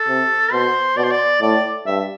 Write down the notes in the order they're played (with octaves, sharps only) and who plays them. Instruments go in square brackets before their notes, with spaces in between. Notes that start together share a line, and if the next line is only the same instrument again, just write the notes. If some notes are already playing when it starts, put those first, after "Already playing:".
Already playing: [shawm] A4
[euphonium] C3
[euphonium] B2 [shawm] C5
[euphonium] B2 [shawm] D5
[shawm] C5
D5
[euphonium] A2 [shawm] D5
[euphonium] G2 [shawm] E5